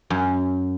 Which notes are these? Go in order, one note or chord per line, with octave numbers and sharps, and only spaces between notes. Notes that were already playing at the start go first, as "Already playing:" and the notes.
F#2